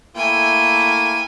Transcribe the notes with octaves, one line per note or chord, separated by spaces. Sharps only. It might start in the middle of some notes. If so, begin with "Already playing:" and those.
A3 A#3 E4 G5 G#5